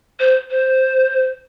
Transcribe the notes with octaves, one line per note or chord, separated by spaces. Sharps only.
C5
C5